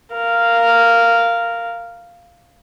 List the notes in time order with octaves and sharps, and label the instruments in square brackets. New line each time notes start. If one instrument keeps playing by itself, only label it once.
[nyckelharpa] A#4 F5